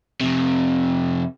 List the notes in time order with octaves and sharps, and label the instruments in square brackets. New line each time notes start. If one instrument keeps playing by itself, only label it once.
[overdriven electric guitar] F2 C3